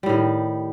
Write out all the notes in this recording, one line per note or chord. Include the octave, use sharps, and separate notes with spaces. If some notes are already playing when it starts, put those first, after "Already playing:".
A2 D#3 G3